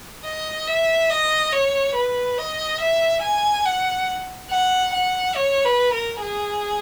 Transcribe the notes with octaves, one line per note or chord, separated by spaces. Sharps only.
D#5
E5
D#5
C#5
B4
D#5
E5
G#5
F#5
F#5
F#5
C#5
B4
A#4
G#4